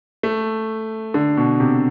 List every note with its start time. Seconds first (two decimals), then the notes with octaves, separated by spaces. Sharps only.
0.23 A3
1.14 D3
1.37 B2
1.60 C3